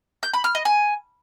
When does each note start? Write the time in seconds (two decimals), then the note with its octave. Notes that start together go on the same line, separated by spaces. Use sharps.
0.23 G6
0.33 B5
0.44 F6
0.55 D#5
0.65 G#5